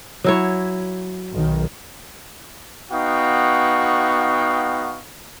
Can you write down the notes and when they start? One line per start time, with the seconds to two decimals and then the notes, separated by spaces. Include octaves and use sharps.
0.24 F#3 E4 C#5
1.34 B1 D#3
2.91 B3 D#4 F#4 F5 G5 C#6